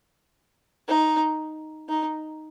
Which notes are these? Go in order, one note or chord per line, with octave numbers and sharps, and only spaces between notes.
D#4
D#4